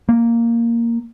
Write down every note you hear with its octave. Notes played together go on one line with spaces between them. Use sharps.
A#3